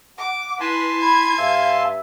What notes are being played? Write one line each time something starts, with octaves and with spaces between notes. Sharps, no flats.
F#5 D6
E4 B4 G#5 A5 C6
B5 G#6
G2 E5 F5